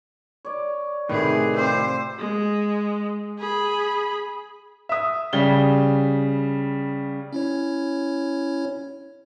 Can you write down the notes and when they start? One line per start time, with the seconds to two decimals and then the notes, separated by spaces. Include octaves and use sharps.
0.45 C#5 D5
1.09 A2 C3 D#3 G#4 B4
1.56 C4 F4 G4 C5
2.19 G#3
3.39 G#4 B5
4.89 E5 D#6
5.33 C#3 G3 G7
7.33 C#4 E4 C#5